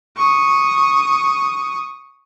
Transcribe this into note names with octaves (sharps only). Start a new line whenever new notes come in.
C#6 D#6